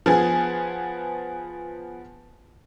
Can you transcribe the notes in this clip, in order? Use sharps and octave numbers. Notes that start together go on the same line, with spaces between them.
F3 B3 G#4